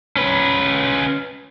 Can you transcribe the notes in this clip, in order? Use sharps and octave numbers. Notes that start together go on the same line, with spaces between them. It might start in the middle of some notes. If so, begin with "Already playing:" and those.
C#4 B4